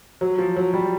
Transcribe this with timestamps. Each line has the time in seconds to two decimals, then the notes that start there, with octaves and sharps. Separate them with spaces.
0.21 F#3
0.38 F3
0.56 F#3
0.74 G3